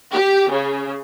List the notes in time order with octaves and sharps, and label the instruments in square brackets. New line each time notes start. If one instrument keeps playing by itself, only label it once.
[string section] G4
C#3